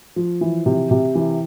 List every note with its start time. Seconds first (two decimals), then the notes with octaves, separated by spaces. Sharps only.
0.16 F3
0.41 E3
0.66 C3
0.91 C3
1.15 E3